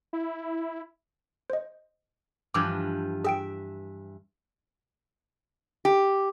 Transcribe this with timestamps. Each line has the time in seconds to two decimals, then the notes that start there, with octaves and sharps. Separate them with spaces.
0.13 E4
1.50 C5 D#5
2.54 G2 E3 F3 D6 E6 G#6
3.24 G#4 E5 G5 D7
5.85 G4